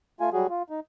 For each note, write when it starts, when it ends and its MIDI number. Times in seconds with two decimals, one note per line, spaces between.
0.20 0.30 57
0.20 0.30 65
0.20 0.30 80
0.33 0.47 54
0.33 0.47 55
0.33 0.47 66
0.33 0.47 68
0.50 0.63 65
0.70 0.80 63